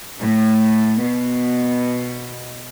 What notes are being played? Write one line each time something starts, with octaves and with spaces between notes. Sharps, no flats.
A2
B2